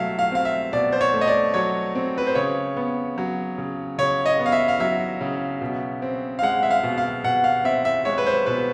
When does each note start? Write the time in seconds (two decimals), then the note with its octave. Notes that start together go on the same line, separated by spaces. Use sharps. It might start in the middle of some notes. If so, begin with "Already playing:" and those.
Already playing: B2 F#3 A3 E5 F5
0.19 F5
0.32 C4 F5
0.45 E5
0.73 B2 D5
0.92 C5
1.01 C#5
1.14 A3
1.21 D#5
1.28 D5
1.54 F#3 C#5
1.95 C4
2.18 B4
2.27 C5
2.35 C#3 C#5
2.77 B3
3.18 F#3
3.58 C#3
3.98 C#3 C#5
4.26 D#5
4.39 B3
4.46 F5
4.52 E5
4.68 F5
4.80 F#3 E5
5.21 C#3
5.61 B2
6.02 C4
6.39 F5
6.42 G#3 F#5
6.63 E5
6.71 F5
6.83 B2
6.98 F5
7.24 B2 F#5
7.44 F5
7.64 C4 E5
7.85 E5
8.05 G#3 C#5
8.18 B4
8.26 C5
8.46 B2 B4